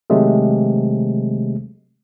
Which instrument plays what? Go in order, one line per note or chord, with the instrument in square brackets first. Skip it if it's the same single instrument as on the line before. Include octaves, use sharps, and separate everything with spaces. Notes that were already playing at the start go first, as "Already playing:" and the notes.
[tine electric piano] C3 D#3 F#3 G#3 A3